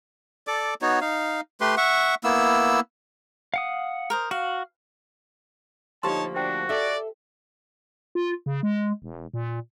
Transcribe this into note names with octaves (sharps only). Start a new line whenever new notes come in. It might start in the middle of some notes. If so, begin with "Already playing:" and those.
A4 D5 D6
B3 D#4 F#4 C#5
D#4 F5
A3 G4 B4 C6
E5 F#5 C#6
A#3 B3 E4 E6
F5 F#5 D#6
A#4 C5 D#5
F#4 F5
D2 F3 A#3 D#4 G4 C#5 A5 C6
D4 F#4 C5 G5
A4 D5 E5
F4
C#3
G#3
E1
A#2